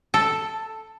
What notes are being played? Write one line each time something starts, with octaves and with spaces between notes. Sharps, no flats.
A4